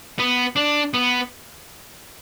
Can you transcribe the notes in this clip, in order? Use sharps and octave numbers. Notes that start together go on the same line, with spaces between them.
B3
D4
B3